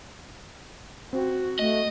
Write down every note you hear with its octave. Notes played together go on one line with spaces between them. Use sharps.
C4 F#4
A3 D#5